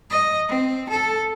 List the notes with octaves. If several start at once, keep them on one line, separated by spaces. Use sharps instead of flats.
D#5
C4
A4